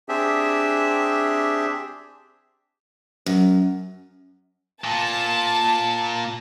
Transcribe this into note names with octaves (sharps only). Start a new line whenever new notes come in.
C4 D4 G4 G#4 E5
F#2
A#2 A5